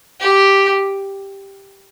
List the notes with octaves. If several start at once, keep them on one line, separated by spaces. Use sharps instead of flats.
G4